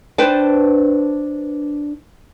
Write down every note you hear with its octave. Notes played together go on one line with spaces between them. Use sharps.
D4 B4 C5 G5 A5